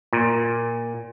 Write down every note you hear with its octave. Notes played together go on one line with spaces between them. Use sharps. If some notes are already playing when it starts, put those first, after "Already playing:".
A#2